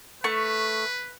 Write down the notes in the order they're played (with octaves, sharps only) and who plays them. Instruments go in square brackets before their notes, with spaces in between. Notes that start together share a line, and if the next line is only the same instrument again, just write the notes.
[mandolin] A3 C#6 [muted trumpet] B4